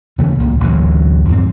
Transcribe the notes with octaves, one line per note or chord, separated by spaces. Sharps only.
D#2 C#3 E3 A3
C#2 G2 A#2
A1 D2 E3 F#3
F2 G#2 G3 C4